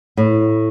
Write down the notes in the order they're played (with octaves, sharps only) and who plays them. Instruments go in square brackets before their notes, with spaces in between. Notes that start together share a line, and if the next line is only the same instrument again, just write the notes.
[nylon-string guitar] A2